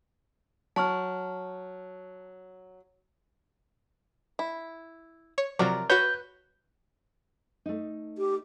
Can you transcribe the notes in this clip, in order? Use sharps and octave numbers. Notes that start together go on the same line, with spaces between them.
F#3 A5 C#6 F6
E4
C#5
C3 F3 F#3 A#4 D5
F#4 B4 C#5 G6
A3 D#4
G4